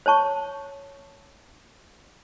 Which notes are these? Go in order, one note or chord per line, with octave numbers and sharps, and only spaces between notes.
C5 C#5 A5 C#6